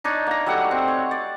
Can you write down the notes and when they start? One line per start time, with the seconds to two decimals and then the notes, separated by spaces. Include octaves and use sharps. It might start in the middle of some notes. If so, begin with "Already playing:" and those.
0.04 D4 D#4 C#5 D5
0.27 A#3 A#5
0.46 F#3 G3 A3 F#5
0.71 C4
0.88 C#5
1.11 D5